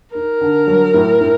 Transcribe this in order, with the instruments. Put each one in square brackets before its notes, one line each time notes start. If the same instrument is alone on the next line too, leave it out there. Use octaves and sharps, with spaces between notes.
[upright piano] D#4 [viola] A#4
[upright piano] D3
F#3
A2
A2